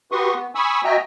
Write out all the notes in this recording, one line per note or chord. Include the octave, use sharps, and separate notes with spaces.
F#4 G4 B4 C6 C#6 D#6
B3
G#5 B5 C#6 D#6 E6
F#4 D#5 E5 G5 G#5 A#5